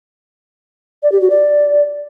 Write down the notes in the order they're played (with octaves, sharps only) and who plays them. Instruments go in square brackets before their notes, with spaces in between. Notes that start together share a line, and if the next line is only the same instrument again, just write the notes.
[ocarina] D5
G4
F#4
D5